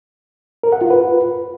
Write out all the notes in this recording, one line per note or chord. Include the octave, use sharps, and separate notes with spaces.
A#4
F#5
F4
B4